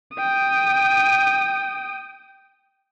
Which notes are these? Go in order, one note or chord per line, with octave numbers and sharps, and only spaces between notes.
G5 D#6